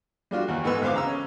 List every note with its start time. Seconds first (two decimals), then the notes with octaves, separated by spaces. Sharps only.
0.31 G3 D4 F4 F#4
0.48 D#2 E3 F#5
0.64 G#2 E3 B3 A4 B4 E6
0.82 D2 B3 C5 F5 D6
0.94 C#3 A#5 E6
1.06 C#4